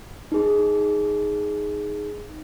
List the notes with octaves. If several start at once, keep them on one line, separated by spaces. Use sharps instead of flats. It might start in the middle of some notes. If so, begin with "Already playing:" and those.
D#4 G#4